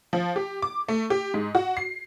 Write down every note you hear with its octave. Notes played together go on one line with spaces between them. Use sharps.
F3
G4
D6
A3
G4
G#2
F#4
C7